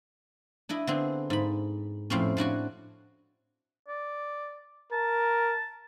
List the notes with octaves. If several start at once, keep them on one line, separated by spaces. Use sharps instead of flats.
D4 E4 D#5
D3 B3 C4 G#4
G#2 B5
F2 A2 C4 C#4
A2 D4 F#4 G#5
D5
A#4 A5